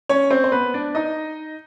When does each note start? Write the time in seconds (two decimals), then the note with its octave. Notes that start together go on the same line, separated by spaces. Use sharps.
0.09 C#4 C#5
0.31 C4 C5
0.44 C5
0.52 B3 B4
0.74 D4 D5
0.95 D#4 D#5